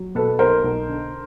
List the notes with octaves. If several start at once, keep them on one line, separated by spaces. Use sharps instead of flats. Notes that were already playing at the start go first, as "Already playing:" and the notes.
Already playing: F#3
B2 A4 B4
B1 A#4 C5
B1
D3